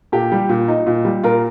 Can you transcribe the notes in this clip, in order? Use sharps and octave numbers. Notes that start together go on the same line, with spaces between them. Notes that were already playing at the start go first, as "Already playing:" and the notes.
A#2 G4
G3
A#2
D#4
A#2
G3
A#2 F4 A#4